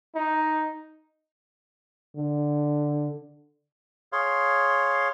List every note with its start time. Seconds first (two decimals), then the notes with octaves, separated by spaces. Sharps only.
0.15 D#4
2.16 D3
4.12 G#4 C#5 F5 C6